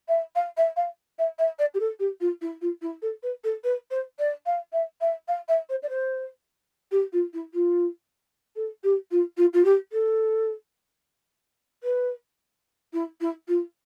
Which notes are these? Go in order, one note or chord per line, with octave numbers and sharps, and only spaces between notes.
E5
F5
E5
F5
E5
E5
D5
G4
A4
G4
F4
E4
F4
E4
A4
B4
A4
B4
C5
D5
F5
E5
E5
F5
E5
C5
D5
C5
G4
F4
E4
F4
A4
G4
F4
F4
F4
G4
A4
B4
E4
E4
F4